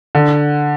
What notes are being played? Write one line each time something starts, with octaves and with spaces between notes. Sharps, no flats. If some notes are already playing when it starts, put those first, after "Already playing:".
D3